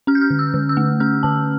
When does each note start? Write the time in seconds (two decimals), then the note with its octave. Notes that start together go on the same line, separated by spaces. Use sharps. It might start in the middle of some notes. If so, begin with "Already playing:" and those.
0.07 C#4 F6
0.15 G6
0.21 F6
0.30 D3
0.39 E6
0.54 D3
0.69 E6
0.77 A3
1.00 C#4 F6
1.23 D3 A5